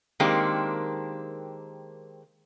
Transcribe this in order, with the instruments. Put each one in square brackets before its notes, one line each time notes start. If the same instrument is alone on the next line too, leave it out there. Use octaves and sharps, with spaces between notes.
[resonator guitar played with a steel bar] D#3 G#3 A#3 C4 D4 G4